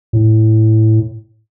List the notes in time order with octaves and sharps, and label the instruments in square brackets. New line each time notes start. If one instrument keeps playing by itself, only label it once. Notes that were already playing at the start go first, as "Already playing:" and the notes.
[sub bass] A2